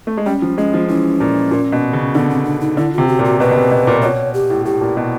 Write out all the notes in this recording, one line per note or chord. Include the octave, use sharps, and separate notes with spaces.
A3
G#3
G3 C#4
F3
G#3 C#4
F3
E3 C#4
A#2
A#2
B2
C#3
D3 B3
C4
D4
D#4
D3 E4
C3 F4
F#4
A#2
F#4
B2 B4
B2
C3
B2
A#2
B2 C#5
G4
A2
A2 G4
A#2
B2